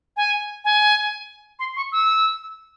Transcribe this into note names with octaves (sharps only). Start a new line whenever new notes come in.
G#5
G#5
C6
C#6
E6